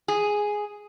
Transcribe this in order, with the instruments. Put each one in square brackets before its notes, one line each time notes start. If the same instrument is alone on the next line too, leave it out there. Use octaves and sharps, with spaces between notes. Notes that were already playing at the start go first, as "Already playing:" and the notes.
[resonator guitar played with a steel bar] G#4